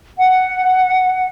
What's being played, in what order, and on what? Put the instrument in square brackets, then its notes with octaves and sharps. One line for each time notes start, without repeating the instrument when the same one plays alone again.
[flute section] F#5